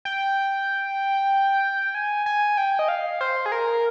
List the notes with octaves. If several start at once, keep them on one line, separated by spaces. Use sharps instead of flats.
G5
G#5
G#5
G5
D#5
F5
C5
G#4
A#4